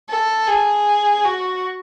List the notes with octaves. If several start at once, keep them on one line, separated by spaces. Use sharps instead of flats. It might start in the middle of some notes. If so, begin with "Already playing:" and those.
A4
G#4
F#4